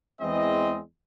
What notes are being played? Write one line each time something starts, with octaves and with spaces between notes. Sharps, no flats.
E2 E3 G#3 C4 D#5